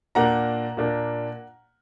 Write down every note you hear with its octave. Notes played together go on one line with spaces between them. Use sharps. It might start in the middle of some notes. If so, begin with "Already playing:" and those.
A#2 A#3 D4 F#5 A#5
A#2 A#3 D4